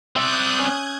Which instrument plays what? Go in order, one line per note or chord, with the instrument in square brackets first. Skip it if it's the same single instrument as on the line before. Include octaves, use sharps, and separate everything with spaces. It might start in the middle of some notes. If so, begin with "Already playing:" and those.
[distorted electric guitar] C4 D5 [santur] E5 [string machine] D#6 F#6 G6
[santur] C#4 [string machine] G#6